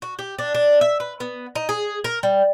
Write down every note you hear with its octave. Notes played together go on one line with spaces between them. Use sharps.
F#4
G4
D4
D4
E5
B4
B3
D#4
G#4
A#4
G3